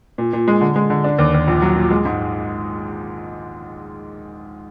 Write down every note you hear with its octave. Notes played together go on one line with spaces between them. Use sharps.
A#2
A#2
G#3
D3
G#3
D3
D4
D#2
D#2
A#1
F#3
A#2
G#3
G#2